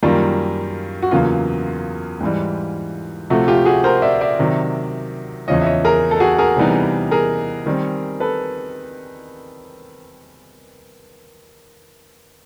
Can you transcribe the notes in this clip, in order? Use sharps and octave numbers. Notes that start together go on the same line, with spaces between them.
F#2 D#3 G3 A#3 F4
F#4
E2 C#3 F#3 A#3 F4
G#2 E3 G3
C3 F3 A3 F#4
F4 G4
F#4 G#4
A#4 C5
D5 E5
D5 E5
C3 D#3 F#3
E2 C#3 F3 C#5 D#5
E5
C#5 D#5
G#4 A#4
A4
F#4 G#4
G#4 A#4
C3 E3 G3 B3 D#4
G#4 A#4
D#3 G3 C4
A4 B4